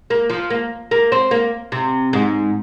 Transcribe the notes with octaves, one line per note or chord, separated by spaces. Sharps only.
A#3
F3
A#3
A#3
C4
A#3
C3
G#2